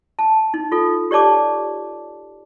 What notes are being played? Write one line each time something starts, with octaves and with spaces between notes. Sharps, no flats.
A5
D#4
F4 A4
G4 C#5 D5 A5 D6